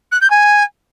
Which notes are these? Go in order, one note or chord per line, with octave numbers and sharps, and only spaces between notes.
F#6
G6
G#5